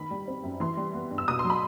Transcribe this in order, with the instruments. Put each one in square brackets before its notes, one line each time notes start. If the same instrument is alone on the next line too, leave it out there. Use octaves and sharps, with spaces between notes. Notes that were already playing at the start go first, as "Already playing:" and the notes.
Already playing: [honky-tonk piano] D#3 B5
G3
C4
F#2
E3 C6
G3
B3
G2
E6
B2 D#6
C6
F#3
B5